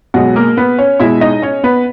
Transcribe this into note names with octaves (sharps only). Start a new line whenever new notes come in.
B2 F#3 G#3 F#4
A#3 A#4
B3 B4
C#4 C#5
B2 G#3 E4 E5
D#4 D#5
C#4 C#5
B3 B4